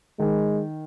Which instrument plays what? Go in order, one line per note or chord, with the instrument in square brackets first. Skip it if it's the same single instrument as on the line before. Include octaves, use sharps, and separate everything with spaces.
[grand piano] D#3 [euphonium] G#3